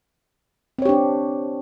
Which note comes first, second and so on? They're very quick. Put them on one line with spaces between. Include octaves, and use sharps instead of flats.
C4 C#5 G4 D4